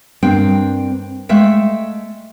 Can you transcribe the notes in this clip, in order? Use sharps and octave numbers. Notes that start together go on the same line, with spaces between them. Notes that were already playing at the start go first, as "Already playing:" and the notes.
G2 A#3 C4 D4 C5 G5
G#3 A3 E5 F5 G5